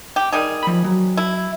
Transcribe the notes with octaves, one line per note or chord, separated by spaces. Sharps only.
G4
D#3 G3 G#4
F3 B5
F#3
E4